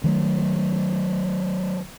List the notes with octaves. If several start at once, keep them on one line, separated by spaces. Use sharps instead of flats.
D#3 F#3 A3